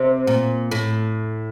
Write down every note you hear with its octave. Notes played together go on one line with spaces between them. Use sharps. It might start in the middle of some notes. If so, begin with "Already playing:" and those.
Already playing: C3
A#2
A2